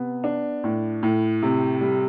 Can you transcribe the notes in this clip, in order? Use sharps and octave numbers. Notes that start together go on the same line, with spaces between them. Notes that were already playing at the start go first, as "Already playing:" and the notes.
Already playing: C3 B3
D4
A2
A2
C3
G3